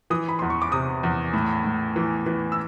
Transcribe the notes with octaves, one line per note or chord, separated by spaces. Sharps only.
E3 D#6
B5
E2 C6
C#6
D6
C3 D#6
E2
A2
A2
E3
E3
E6